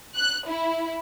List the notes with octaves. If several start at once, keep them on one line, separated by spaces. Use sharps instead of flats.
F#6
E4